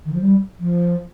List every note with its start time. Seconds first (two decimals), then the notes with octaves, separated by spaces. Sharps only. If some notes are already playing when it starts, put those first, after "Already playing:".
0.05 D#3
0.13 F3
0.21 G3
0.60 F3